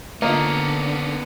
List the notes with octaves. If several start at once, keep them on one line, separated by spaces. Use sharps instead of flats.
D3 A#3 B3 C#4 F4 D#5